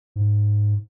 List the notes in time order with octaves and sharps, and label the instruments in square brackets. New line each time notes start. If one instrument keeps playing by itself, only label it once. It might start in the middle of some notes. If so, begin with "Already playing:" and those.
[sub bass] G#2